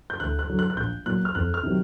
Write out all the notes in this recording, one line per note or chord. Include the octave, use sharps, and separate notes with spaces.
G6
D2 F#6
F#6
D3 F#3
F#6
F#6
A#1 G6
A#2 F#3 F#6
F6
F2 F#6
F6
C3 D#3 F#3